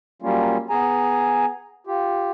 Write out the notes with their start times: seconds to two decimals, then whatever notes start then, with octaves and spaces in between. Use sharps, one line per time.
0.22 F#3 G3 A#3 C#4 F4
0.70 B3 G#4 G#5 A#5
1.87 F4 G4